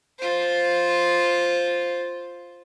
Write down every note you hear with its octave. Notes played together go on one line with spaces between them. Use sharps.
F4 C5